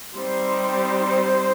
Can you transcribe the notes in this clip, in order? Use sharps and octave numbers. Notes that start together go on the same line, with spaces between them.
G3 C4 D#4 C5